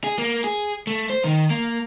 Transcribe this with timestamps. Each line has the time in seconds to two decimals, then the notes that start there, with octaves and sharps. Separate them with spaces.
0.04 G#4
0.19 A#3
0.44 G#4
0.87 A3
1.10 C5
1.25 D#3
1.50 A#3